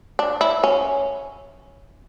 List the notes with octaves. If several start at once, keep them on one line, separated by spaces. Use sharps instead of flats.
D4
E4
C#4